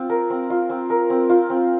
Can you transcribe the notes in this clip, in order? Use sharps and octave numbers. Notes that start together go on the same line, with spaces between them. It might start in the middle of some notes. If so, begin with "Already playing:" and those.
Already playing: C4 F4
A#4
C4
F4
C4
A#4
C4
F4
C4